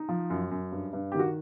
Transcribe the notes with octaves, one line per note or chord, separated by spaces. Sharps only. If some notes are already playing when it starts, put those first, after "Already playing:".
Already playing: D#4
F3
F#2
F#2
G2
G2
D#3 G4
F#4